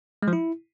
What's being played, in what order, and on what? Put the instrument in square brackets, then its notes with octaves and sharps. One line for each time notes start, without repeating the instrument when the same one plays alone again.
[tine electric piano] G#3
F3
E4